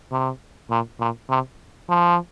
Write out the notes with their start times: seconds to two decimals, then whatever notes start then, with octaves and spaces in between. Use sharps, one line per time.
0.12 C3
0.70 A#2
1.00 A#2
1.30 C3
1.89 F3